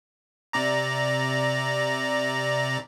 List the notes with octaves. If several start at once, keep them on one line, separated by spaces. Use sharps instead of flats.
C3 D5 A#5